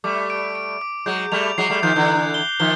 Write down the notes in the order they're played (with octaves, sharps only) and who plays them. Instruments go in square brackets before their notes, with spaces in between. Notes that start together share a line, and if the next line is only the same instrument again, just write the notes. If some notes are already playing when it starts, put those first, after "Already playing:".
[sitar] G3 A3 [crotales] D6
[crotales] D7
D7
D6
[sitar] F#3 G#3 [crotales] G6
[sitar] G3 A3 [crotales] F7
[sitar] F#3 G#3 [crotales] C7
[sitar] G3 A3
[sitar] D#3 F3 [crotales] G6
[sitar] D3 E3
[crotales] F#6
G7
[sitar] D#3 F3 [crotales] G7